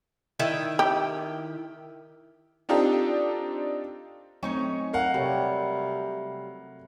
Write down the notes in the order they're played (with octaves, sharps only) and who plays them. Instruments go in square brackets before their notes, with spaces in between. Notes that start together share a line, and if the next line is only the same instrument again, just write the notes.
[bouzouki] D#3 E4 G5
[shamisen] G4
[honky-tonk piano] C4 D4 D#4 F4 G4 A4
[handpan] F#3 A3 C4 [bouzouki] C#4 D#4 C#5
[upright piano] A#4 F5 F#5
[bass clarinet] C3 [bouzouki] G3 [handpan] F#4 A4 C#5